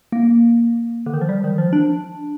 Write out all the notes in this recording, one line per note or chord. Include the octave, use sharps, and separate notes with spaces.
A#3
D3
D#3
F3
G3
D#3
F3
D4